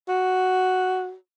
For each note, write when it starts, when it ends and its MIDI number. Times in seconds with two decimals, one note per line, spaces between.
0.08 1.14 66